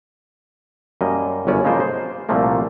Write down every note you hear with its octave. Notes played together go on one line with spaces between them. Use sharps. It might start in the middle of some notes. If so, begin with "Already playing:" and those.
F#2 G3 A#3 D#5
G1 F#2 C#4 D5
C#3 F3 G#3 A#3 F4 C5
C5
C2 A#2 F3 A3 A#3